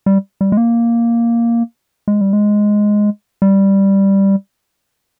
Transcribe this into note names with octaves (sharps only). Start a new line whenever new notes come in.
G3
G3
G#3
A#3
G#3
G3
G#3
G3